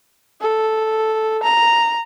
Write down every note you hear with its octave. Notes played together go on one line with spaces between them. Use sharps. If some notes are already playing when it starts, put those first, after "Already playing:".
A4
A#5